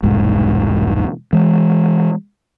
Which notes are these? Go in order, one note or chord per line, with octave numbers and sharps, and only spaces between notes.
E1 C2 G#2
E3 G#3